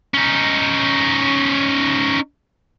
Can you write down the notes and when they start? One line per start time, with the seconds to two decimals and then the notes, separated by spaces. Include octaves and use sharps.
0.14 C#4 D#4